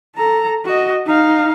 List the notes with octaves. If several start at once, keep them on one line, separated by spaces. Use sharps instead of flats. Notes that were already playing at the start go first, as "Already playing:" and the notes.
A4 A#5
F#4 D#5
D#4 F5